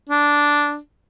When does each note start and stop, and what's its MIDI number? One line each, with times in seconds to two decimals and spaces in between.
0.09 0.78 62